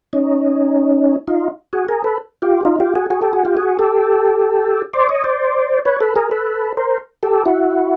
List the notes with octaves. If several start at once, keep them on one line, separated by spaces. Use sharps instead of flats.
C#4 D#4
D#4 F4
F#4 G#4
G#4 A#4
A4 B4
F4 G4
D#4 F4
F4 G4
F#4 G#4
F#4 G#4
G4 A4
F#4 G#4
F4 G4
F#4 G#4
G4 A4
C5 D5
C#5 D#5
C5 D5
B4 C#5
A4 B4
G#4 A#4
A4 B4
A#4 C5
G4 A4
E4 F#4